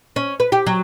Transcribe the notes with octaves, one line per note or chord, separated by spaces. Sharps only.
C#4
B4
G4
F#3